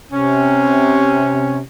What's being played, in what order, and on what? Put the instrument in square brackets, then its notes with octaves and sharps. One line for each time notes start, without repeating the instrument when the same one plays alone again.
[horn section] C3 C#4